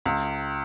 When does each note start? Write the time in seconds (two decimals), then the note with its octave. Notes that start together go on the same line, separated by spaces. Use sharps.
0.05 C#2